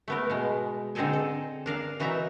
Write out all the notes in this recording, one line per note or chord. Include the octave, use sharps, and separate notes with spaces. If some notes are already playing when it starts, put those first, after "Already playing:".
A3 B3 A#4
B2 G#3
D3 C4 D#4 G#4 A4 G#5
A4
D4 A#4 F5
E3 F#3 D#4 E5 A#5